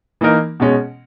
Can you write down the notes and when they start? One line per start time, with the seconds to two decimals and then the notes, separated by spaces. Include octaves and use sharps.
0.21 E3 A#3 D#4 A#4
0.60 B2 G#3 C#4